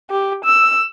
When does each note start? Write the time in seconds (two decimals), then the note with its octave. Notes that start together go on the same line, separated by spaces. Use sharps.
0.10 G4
0.44 E6